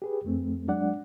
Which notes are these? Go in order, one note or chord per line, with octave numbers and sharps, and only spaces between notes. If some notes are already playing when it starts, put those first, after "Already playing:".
G4 G#4 B4
F2 A3 C4
F#3 G#3 D4 D5 F#5